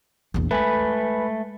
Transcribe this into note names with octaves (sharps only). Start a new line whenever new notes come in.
A#1 E2
G#3 A3 B4 G#5 B5